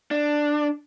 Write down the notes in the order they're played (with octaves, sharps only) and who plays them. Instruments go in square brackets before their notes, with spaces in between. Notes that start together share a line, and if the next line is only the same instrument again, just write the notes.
[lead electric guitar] D4